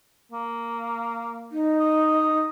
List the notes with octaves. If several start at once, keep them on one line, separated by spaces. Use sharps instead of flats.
A#3
D#4
D#5